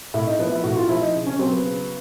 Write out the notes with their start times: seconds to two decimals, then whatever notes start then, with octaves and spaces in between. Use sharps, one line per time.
0.14 A2 E4
0.27 D#4
0.39 F3 B3
0.52 E4
0.64 A2 F#4
0.77 F4
0.89 F3 E4
1.01 D#4
1.14 C#3
1.27 C#4
1.39 F#3 C4
1.52 B3
1.64 C#3